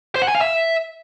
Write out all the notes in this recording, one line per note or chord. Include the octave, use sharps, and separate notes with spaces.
C5
F#5
G#5
F5
E5